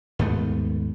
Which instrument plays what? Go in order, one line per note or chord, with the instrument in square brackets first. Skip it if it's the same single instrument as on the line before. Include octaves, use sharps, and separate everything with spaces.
[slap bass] D#2 G#2 A3 B3